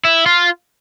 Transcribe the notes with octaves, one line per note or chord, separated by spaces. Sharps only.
E4
F4